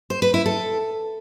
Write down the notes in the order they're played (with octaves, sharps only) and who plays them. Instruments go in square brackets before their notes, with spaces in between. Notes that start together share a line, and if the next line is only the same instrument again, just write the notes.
[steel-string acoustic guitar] C5
B4
E4
A4